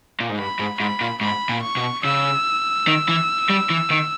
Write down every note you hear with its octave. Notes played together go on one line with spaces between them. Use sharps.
A#2
G#2
G2 B5
G#2
G#2 B5
A#2
G#2 B5
A#2
C#6
B2
C#3 E6
D#3
E3
G3
E3
D#3